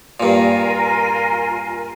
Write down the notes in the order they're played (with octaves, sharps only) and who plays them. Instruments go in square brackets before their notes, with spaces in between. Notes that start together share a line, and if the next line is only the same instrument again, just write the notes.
[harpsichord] G2 A#2 [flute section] F4 A#4 G#5